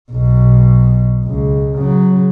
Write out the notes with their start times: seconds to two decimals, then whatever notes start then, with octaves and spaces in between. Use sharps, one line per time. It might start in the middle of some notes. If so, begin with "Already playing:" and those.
0.11 B1 B2
1.24 C#2
1.75 C#3 F#3